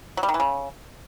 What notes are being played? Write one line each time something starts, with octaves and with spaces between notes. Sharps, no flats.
F#3
G3
D#3
E3
C#3